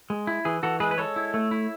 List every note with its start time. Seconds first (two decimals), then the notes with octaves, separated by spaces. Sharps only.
0.10 G#3
0.27 E4
0.45 E3 G#4
0.63 E3 F#4 A4
0.80 G#3 G#4 B4
0.91 B4
0.98 G#3 A4 C#5
1.16 E4
1.34 A3
1.51 E4